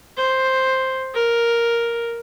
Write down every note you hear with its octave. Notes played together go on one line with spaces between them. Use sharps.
C5
A#4